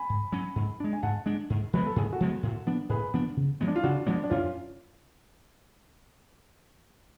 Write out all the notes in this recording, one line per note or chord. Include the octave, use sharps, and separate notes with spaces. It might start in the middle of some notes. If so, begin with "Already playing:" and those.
Already playing: G#5 B5
G#2
F#3 C#4
G#2
G#3 D4
G#5
G#2 F#5 A5
G#3 D4
G#2
F3 G#3 B3 B4
A4
G#2 G#4
F#4 A4
F3 G#3 B3
A2
F3 B3 D4
A2 G#4 B4
F3 B3 D4
C#3
F3 G#3 B3
D4
F4
C#3 D4 F#4
F3 G#3 B3 D4
D4
F#2 C#4 F4